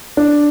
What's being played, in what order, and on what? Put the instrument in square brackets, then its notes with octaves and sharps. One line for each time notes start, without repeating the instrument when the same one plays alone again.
[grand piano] D4